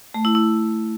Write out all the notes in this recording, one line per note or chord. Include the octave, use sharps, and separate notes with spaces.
A3
E4
E4